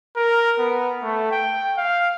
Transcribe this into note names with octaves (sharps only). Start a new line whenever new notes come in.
A#4
B3
A3
G5
F5